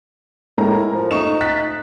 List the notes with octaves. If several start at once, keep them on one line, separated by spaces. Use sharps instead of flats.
A2 G#3 A#4 A#5
F3
A3 D#4 C#6 E7
F#6 A6 B6